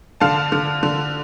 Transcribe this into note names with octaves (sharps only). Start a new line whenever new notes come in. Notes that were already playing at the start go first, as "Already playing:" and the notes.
D3 F5 A5
D3
D3